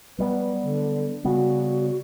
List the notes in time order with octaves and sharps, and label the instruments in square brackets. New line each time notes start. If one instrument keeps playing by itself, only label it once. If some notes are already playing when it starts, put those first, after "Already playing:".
[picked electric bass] F#3 G3 B3 [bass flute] B4
[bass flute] D3
[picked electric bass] C#3 G3 B3 [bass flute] F#4